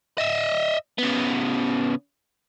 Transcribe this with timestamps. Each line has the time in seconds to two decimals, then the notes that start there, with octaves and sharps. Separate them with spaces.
0.18 D#5 E5
0.99 C#3 B3